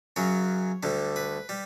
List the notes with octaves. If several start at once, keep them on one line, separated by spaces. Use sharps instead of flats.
F#2 C#3 F#3 C#5
D2 D3 G3
B4
G3